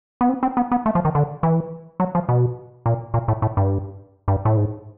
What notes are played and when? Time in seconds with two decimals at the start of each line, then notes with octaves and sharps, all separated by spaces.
0.21 B3
0.29 C4
0.43 C4
0.57 B3
0.72 B3
0.86 A3
0.95 F3
1.05 D#3
1.15 D3
1.43 E3
2.00 F#3
2.15 F3
2.29 B2
2.86 A#2
3.14 A#2
3.28 A2
3.42 A2
3.57 G2
4.28 G2
4.45 A2
4.57 G#2